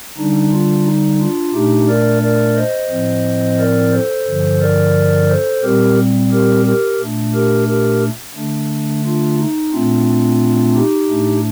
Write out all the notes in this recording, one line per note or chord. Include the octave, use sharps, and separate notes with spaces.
D3 G3 D4 D#4
D4 F4
D#4
D4 F4
A#2 A3 D4 D#4 G4
A#4 D5
A#4 D5
C5 D#5
A2 F3 C4
A#4 D5
A4 C5
G2 D3 F3
A#4 D5
A4 C5
A#2 G3 C4 G4 A#4
G4 A#4
G4 A#4
A#2 A3 D4
G4 A#4
G4 A#4
D3 A3 D4
D4 F4
D#4
A#2 A3 C4 D4 F4
D#4 G4
A2 A3 D4